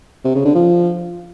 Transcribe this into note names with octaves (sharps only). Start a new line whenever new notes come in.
C3
C#3
D3
F3